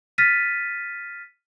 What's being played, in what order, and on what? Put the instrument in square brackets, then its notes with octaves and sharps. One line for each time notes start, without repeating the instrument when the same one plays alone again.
[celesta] F6 A6 B6 D#7